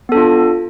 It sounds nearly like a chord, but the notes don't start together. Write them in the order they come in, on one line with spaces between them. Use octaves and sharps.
B3 A4 D4 F4